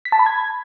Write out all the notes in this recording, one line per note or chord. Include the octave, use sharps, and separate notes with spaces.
B6
A5
B5
G#6